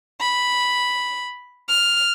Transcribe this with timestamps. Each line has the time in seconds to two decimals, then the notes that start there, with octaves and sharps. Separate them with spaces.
0.21 B5
1.68 F6